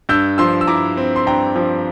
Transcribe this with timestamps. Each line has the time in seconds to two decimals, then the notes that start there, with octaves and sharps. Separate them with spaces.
0.09 G2 E6 G6
0.38 F3 C6 E6
0.61 E6
0.67 E4 A#5 D6
0.97 C4
1.16 C6
1.27 G2 G5 A#5
1.56 F3